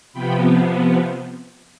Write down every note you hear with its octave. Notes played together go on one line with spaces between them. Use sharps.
C3 F3 B3 G5 B5